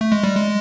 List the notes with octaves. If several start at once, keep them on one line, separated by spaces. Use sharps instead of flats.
A3
G#3
G3
G#3